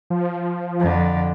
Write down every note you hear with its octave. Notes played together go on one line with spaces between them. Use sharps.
F3
F2 D3